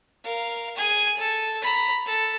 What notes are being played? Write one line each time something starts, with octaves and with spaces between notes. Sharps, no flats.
A#4 F5
G#4 G#5
A4
A#5 B5
A4